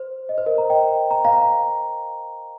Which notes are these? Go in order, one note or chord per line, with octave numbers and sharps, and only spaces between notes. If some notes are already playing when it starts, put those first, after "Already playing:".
Already playing: C5
D#5
C5
A#4 D#5
A#5
D#5 G5
A#5
F5 A#5